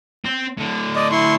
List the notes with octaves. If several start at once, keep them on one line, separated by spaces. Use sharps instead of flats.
C4
A2 D3
D5 D#5
E4 C6 C#6